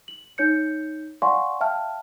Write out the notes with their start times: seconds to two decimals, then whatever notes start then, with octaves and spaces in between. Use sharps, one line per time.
0.08 F#7
0.38 D#4 C#5 G6 C#7
1.22 D5 F5 F#5 G#5 C6 C#6
1.61 E5 F5 G5 A5 F6